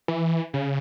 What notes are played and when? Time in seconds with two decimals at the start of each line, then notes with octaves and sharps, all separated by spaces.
0.08 E3
0.54 C#3